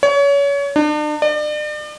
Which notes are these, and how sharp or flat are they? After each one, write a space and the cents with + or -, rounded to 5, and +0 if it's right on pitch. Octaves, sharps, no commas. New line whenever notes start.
C#5 +30
D4 +40
D5 +40